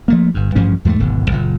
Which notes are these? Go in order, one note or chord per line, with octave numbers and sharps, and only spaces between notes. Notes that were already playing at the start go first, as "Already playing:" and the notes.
F3 A3 A#3
G1 G2
A1 G2 F3 C#4
E2 G#2 G3 A3
D1 G#1 G#2 B2
F#1 A#2